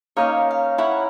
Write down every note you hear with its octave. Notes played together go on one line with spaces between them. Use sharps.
A#3 C#4 D#4 C#5 D#5 F5
F5
E4 C#5 F#5 B5 C#6